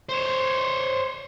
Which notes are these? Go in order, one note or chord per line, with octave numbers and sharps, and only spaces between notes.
C5 C#5